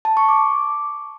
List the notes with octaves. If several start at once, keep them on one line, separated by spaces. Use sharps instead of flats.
A5
C#6
D6